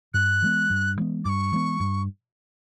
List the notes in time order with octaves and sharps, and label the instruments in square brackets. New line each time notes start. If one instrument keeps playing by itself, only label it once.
[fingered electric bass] G2 [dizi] F#6
[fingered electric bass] E3 G#3 B3
G2
E3 G#3 B3
[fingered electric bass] G2 [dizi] C#6 D6
[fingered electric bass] E3 G#3 B3
G2